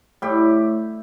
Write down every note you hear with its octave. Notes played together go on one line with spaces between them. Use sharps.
A2 G3 G4